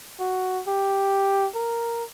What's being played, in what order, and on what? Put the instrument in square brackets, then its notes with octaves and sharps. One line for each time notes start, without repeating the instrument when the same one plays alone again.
[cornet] F#4
G4
A#4